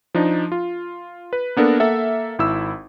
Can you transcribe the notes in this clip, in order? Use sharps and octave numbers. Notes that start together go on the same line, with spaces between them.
F3 D4 D#4
F4
B4
A#3 B3 D4 A4 A#4
A#3 A4 E5 F#5
G#1 E4 E6